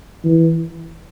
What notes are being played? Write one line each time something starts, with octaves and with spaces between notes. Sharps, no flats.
E3